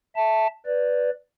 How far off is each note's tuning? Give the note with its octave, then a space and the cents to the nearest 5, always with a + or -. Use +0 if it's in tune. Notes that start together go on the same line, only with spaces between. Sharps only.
E5 -5 A5 +5
B4 +0 D5 +0